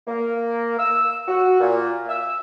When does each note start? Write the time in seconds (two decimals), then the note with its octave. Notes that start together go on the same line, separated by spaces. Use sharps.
0.08 A#3
0.79 E6
1.28 F#4
1.60 A#2
2.09 E6